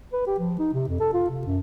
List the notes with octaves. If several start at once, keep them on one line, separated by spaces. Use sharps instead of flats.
B4
G4
F3
D#4
C3
F2
A4
F4
C3
F#2